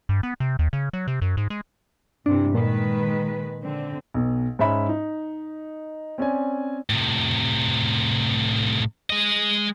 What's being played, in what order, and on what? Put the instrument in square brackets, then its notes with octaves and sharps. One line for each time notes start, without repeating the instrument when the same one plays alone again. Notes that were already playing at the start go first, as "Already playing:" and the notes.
[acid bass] G2
B3
C3
D#2
C#3
F#3
C3
F#2
G#2
G#3
[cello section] G2 C3 E3 [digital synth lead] D4
[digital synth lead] A#2 [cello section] D#3 G#3 B4
[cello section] D3 C4
[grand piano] B1 B2
G#2 C#4 E5 B5
D#4
C4 C#4 D5 G#5
[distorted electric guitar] A2 C3
G#3 D#5